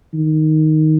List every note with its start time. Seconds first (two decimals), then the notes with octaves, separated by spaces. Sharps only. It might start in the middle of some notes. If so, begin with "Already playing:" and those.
0.14 D#3